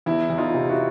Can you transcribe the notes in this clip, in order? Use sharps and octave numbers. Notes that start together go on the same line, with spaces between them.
E2 E4
E2
D#4 F4
C3
E4 F#4